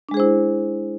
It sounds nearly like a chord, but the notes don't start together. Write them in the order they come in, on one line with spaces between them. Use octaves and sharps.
D4 G#3 G#4 C5 E4